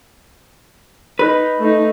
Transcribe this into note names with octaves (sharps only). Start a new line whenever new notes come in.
D#4 B4
A3 D#4